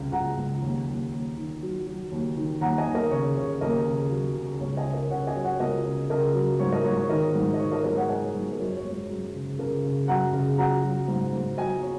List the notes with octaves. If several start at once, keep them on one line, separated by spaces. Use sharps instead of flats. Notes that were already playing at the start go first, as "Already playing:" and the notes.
Already playing: C#2 C#3
C#2 F#5 A#5
C#2
D#2
D#2
D#2
D#3
F#3
F#3
D#2
D#3
D#2 F#5 A#5
D#5 G#5
D#2
A#4 D#5
C#3 C#5
C#3 C#5
D#2 A#4 D#5
C#3
F#3
C#3
C#2 C#5
D#5 G#5
C#3
A#4 D#5
C#3 C#5 F#5
D#5 G#5
F#3
C#5 F#5
C#2 A#4 D#5
C#3
C#3 A#4 D#5
F#3
G#2 C#5
A#4 D#5
G#2 C#5
C#5
D#3 A#4 D#5
G#2
D#5
D#3 C#5
A#4 D#5
G#3 A#4 D#5
C#5 F#5
G#3 D#5 G#5
G#2
A#4
F#2 C#5
C#5
G#3
C#5
F#2
C#3
C#3 A#4
C#3
F#2 F#5 A#5
C#3
F#3 F#5 A#5
F#3
G#2
G#2
F#3 D#5 G#5
C#5